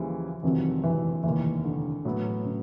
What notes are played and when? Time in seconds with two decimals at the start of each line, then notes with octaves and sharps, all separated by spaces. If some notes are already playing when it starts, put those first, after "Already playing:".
Already playing: D#2 C#3 E3 F3 G3
0.43 F1 F2 C3 D#3 E3 F#3
0.84 E3
1.23 F1 D#2 D#3 E3
1.64 D3
2.05 A2 F#3 B3
2.45 C#3